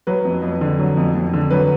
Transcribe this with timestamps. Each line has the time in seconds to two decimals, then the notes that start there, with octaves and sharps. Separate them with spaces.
0.07 F#3 B4
0.25 F2
0.42 F2
0.61 D3
0.79 F#3
0.97 F2
1.15 F2
1.33 D3
1.50 F#3 B4